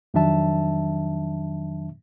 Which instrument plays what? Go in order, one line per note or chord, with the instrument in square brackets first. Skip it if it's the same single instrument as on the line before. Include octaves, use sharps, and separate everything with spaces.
[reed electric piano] F2 D#3 F#3 D4 E5 A5